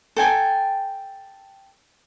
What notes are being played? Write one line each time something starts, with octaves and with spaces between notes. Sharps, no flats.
A4 G5 G#5